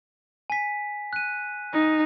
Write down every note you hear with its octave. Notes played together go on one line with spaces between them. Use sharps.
G#5 B6
F#6 D#7
D#4